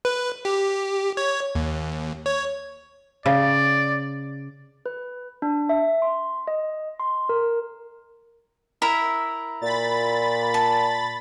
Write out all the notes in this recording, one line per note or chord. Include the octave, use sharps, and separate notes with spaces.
B4
G4
C#5
D#2
C#5
C#3 D5
B4
D4
E5
C6
D#5
C6
A#4
E4 A#4 E5
A#2 B5 A6
A5